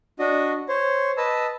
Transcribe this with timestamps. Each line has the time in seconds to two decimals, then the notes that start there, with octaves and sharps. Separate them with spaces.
0.19 D4 F#4 D#5
0.69 C5 C#5
1.17 B4 D#5 A5 E6